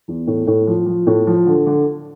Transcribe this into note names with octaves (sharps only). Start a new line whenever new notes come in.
E2
A2
A2
F3
F3
A2
F3
D3
D3